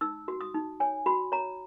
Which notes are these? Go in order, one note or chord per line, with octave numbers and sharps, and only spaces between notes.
D#4 E6
F#4
D#6
D#4
C#5 G#5
F#4 B5
C#5 A#5